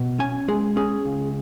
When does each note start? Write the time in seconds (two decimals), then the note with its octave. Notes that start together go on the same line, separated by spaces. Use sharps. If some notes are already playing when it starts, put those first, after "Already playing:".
Already playing: B2
0.19 C#4 G#5
0.48 G#3 G#4
0.76 C#4 G#4
1.06 C#2